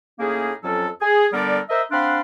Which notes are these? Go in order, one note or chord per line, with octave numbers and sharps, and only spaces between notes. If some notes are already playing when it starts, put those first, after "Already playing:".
A2 A#3 C#4 D#4 G#4
F2 F#3 C#4 A4
G#4
D3 G3 B3 A4 A#4 D5
A#4 C5 D#5 E5
C4 D4 F5 F#5 B5 C6